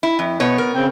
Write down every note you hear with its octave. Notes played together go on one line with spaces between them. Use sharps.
E4
F2
B2 B3 C#5
A#4
C#3 C4 G5